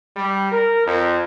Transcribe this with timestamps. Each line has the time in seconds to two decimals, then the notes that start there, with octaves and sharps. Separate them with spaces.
0.17 G3
0.52 A#4
0.86 F2